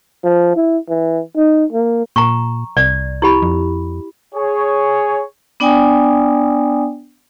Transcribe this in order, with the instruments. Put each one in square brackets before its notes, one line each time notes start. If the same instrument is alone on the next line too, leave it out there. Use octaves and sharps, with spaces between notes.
[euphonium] F3
E4
E3
D#4
A#3
[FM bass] A#2 [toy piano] A#5 C#6
[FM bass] C2 [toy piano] D5
[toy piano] E4 G4 B5
[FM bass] F2
[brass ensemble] G#4 C#5
[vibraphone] B3 D4 D5 G5 G#5 D#6